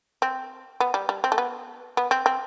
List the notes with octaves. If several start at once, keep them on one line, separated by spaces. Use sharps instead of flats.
C4
B3
G3
G3
C4
A3
B3
B3
C4
C4